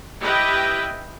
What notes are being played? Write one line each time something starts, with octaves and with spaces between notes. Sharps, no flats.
E4 G4 B4 D#5 G5